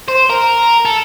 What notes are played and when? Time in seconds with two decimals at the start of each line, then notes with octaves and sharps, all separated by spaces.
0.08 C5
0.30 A#4
0.85 A4